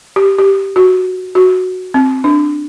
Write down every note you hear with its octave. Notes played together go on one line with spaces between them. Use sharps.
G4
G4
F#4
F#4
C4
D4